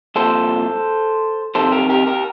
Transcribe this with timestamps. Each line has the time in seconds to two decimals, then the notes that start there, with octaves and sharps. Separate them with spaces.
0.16 C2 A#2 F3 A4 C5
1.55 F2 C3 D#3 A4 C5
1.72 G4 A#4
1.89 G4 A#4
2.07 G4 A#4